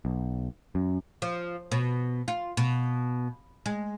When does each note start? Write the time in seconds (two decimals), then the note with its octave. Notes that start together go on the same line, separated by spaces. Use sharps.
0.05 B1
0.75 F#2
1.22 F3
1.72 B2
2.28 F4
2.57 B2
3.66 G#3